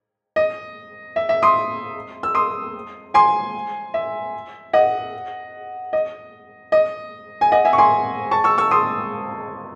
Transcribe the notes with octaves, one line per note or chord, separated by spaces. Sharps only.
D#5
E5
E5
C6 D#6
E6
C6 D#6
G#5 C6
E5
D#5 F#5
D#5
D#5
G#5
D#5 F#5
E5 G#5
C#6
G#5 C6
A5 C#6
C#6 E6
C#6 E6
C6 D#6